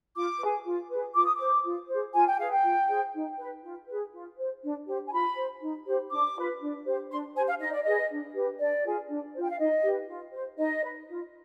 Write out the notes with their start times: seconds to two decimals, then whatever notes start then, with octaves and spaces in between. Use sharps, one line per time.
0.15 F4 D6
0.40 G#4 B4
0.66 F4
0.90 G#4 B4
1.15 F4 D6
1.25 D#6
1.36 C5 D6
1.65 F4
1.89 G#4 C5
2.14 F4 G#5
2.26 G5
2.39 G#4 B4 F5
2.51 G5
2.64 F4
2.89 G#4 C5
3.13 D#4
3.38 B4
3.63 F4
3.88 G#4 B4
4.13 F4
4.38 C5
4.63 D4
4.88 G4 C5
5.07 G#5
5.12 F4 B5
5.37 C5
5.62 D#4
5.87 G4 C5
6.11 D4 D6
6.37 F4 B4
6.61 D4
6.86 G4 C5
7.11 D4 C6
7.36 G4 C5 G#5
7.48 F5
7.61 D#4 D#5
7.72 D5
7.83 G#4 B4 D#5
8.11 D4
8.35 G4 B4
8.60 D4 D5
8.85 F4 G#4
9.10 D4
9.34 F4 C5
9.42 G5
9.51 F5
9.59 D#4 D#5
9.83 G4 B4
10.09 F4
10.33 C5
10.58 D#4 D#5
10.84 B4
11.08 F4